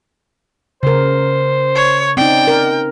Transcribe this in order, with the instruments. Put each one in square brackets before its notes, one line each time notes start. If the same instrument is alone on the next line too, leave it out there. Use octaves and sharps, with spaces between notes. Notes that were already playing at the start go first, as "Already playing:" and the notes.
[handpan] C#3 A#4 [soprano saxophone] C5
[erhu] C#5
[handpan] C4 C#4 D#4 [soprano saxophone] D5 [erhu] G5
[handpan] A#4